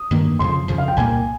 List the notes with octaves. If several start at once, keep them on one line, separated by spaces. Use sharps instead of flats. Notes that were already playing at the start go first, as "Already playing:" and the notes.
Already playing: D#6
G2 D#3 A#3
F2 C#3 F3 C6
F2 C#3 F3
F5
G5
C2 A#2 G3 A#3 G#5